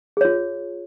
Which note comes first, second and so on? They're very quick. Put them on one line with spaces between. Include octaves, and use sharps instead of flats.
G#4 C#5 F4